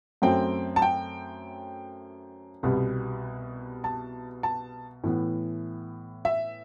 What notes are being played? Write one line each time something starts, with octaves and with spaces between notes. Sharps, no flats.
F#2 F#3 A3 C4 G5
A5
G5
C2 B2 G3 B3
A5
A5
A2 E3 B3
E5